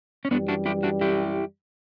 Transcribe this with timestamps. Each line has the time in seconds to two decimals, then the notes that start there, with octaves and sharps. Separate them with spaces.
0.25 C#4
0.31 F#2 E3 G3 B3 D4
0.48 D4 F#4
0.66 E4 G4
0.83 D4 F#4
1.01 E4 G4